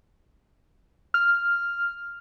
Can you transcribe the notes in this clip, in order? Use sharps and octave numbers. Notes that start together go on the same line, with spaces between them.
F6